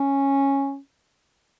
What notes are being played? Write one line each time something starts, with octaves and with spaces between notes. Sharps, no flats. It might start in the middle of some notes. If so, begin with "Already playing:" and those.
Already playing: C#4